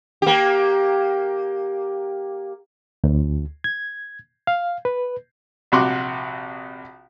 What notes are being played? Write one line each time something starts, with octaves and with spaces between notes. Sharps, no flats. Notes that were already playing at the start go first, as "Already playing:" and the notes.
A#3 G4
D2
G#6
F5
B4
A#1 C3 F#4 C6 D6